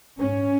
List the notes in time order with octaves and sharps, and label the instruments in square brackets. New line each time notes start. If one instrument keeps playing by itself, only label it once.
[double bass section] G#2 C#4